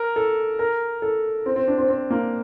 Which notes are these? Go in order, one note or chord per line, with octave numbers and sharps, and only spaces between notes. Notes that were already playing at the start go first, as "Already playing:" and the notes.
Already playing: A#4
A4
A#4
A4
C4
C4
D4
C4
C4
A#3